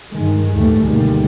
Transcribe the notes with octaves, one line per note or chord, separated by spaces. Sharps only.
G2 D#3 G#3
D#2 A2 E3 G3 A3
D2 B2 D#3 G3 G#3 A#3